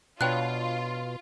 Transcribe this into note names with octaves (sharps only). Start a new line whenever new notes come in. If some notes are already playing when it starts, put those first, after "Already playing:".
B2 D4 F4 B4 C#5 G5 F#6